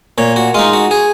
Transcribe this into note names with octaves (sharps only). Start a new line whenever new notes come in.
A#2 C#5
F#4
G#3 D#4 F4
F#4
G#4